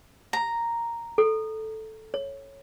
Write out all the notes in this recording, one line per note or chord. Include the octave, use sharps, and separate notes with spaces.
A#5
A4
C#5